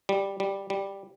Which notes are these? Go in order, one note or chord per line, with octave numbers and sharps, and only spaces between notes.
G3
G3
G3